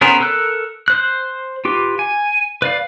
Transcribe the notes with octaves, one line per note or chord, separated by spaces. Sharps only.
B3 C#4 G#4 A#4 C5
A4 A#4 E6 F#6
C5 F#6
F4 G4 B4
G#5
B4 D5 F5